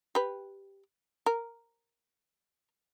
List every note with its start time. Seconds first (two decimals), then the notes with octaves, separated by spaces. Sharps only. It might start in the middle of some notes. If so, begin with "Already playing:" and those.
0.15 G4 B4
1.26 A#4